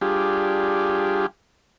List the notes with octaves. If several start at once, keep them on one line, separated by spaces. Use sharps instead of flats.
G3 D4 F4 G4 G#4